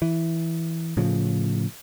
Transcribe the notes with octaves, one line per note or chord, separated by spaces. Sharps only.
E3
A2 C#3 F3